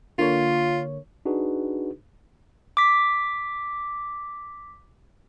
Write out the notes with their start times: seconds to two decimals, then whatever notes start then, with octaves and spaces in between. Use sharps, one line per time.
0.18 D3 A#3 F4 C#5
1.25 D4 D#4 F#4 G#4 B4
2.77 D6 B6